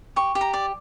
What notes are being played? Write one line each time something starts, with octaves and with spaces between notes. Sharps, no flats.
G4 C#6
G4
A#5
D5